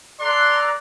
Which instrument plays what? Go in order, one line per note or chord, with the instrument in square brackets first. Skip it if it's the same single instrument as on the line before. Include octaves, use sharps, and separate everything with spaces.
[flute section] A4 A#5 F#6 [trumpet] D5 [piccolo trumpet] C6